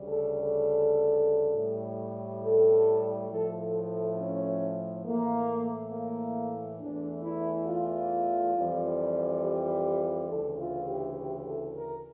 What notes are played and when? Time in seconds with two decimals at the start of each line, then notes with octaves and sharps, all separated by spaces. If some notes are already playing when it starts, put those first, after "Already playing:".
Already playing: D2 C#3 G3
0.08 A4
0.38 A4
1.54 A2 G3
2.43 A4
3.29 A2 F3 A3 A4
3.59 A4
3.88 A4
4.17 C#4
5.04 A2 E3 A3 A#3
5.92 A#3
6.80 E2 E3 A3 D4
7.23 E4
7.67 F4
8.55 F2 E3 G3
9.43 G4
10.29 D2 C#3 E3 A4
10.59 F4
10.88 G4
11.18 G4
11.46 A4
11.76 A#4